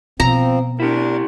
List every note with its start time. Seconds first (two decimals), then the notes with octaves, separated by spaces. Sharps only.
0.20 B2 F3 C4 A#5
0.80 D4 E4 G4 A#4